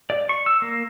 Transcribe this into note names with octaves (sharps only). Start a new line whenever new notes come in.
D5
C#6
E6
A#3